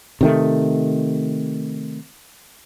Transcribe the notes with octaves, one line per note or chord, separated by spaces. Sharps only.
C3 D#3 A3